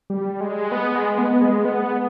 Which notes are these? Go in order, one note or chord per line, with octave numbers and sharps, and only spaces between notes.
G3
G#3
B3
G#3
B3
G#3
B3